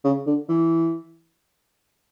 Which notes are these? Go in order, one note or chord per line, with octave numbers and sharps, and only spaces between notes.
C#3
D3
E3